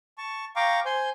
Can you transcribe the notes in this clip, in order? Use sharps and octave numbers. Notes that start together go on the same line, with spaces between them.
A5 C#6
F5 G5 A#5 C#6 D6
C5 G#5 C6 G6